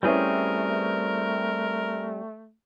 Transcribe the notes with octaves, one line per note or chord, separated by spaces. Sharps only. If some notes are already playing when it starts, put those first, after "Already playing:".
G3 A3 C4 C#4 E4 G#4 A#4 B4